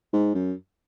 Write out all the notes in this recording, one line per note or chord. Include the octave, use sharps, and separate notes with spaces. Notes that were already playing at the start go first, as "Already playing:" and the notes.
G#2
F#2